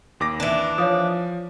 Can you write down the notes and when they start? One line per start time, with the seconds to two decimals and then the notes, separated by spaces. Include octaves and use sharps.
0.20 D#2 D6 A#6
0.40 E3 D4
0.78 F3 C#5 F5 D#6